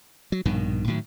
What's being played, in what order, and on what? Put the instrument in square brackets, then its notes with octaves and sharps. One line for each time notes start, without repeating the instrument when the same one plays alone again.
[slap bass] F#3
A#1 G2 B2 D#3
A2 D#3 F#3